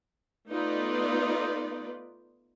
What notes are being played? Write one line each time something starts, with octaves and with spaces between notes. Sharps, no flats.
A3 B3 D#4 F4 B4 D5